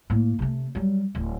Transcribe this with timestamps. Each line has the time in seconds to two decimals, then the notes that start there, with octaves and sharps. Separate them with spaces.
0.10 A2 A#3
0.39 C3 A3
0.75 F#3 G3
1.15 D1